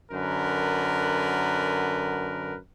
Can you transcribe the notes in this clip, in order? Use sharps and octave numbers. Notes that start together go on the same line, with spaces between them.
F#2 D3 A#4 B4